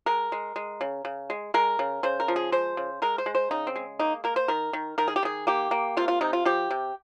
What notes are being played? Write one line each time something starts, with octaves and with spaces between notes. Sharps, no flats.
G#3 A#4
G#3
G#3
C#3
C#3
G#3
G#3 A#4
C#3
C#3 C5
A#4
F3
G#4
G#3 C5
C#3
G#3 A#4
C5
G#3
C5
C#3 D#4
C4
G#3
A#3 D#4
A#3 A#4
C5
D#3 A#4
D#3
D#3 A#4
G#4
G4
D#3 G#4
A#3 G4
A#3
C3 F4
F4
C3 D#4
F4
F3 G4
C3